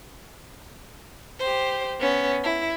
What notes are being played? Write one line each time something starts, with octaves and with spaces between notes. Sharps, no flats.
G4 C5
B3 C#4
E4